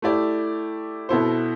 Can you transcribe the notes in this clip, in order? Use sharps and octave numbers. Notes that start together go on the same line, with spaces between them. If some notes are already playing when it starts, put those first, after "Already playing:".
A3 E4 G4 D5
B2 B3 E4 A4 C5